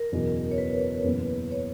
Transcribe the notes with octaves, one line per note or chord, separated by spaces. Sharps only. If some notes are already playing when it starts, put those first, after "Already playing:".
Already playing: A#4
F#1 E2 B2
C#5
B4
F#1 E2 B2 A#3 C#4
C#5